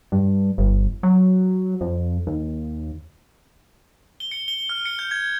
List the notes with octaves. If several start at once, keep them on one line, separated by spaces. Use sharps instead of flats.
G2
G1
F#3
F2
D#2
G7
C#7
G7
F6
C#7
G6
G#6